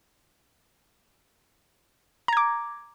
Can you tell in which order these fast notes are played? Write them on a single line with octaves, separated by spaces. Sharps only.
A#5 G#6 D6